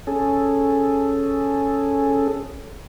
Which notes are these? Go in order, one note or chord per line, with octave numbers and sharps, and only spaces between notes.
C#4 G#4 A4